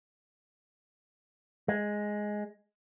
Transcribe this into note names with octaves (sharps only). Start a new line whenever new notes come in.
G#3